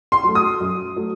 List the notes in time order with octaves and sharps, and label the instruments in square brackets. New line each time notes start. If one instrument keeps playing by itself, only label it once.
[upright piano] C6
F#3 A3
D#6
F#2
F#3 A3